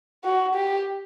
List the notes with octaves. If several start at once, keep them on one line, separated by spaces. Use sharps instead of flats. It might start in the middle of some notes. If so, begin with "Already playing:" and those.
F#4
G4